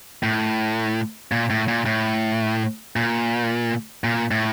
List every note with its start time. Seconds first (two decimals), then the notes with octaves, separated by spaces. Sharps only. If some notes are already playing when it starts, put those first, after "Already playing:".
0.23 A2
1.32 A#2
1.50 A2
1.68 A#2
1.86 A2
2.96 A#2
4.04 A#2
4.31 A2